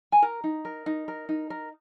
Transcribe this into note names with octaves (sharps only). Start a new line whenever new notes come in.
G#5
A#4 A#5
D#4
A#4
D#4
A#4
D#4
A#4